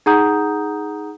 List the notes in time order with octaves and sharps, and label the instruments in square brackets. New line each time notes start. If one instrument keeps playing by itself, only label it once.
[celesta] D#4 G#4 F#5 A#5 D#6 G6